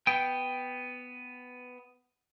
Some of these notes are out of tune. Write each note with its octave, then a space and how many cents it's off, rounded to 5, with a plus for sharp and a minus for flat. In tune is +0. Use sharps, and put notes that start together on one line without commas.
B3 +10 G5 +0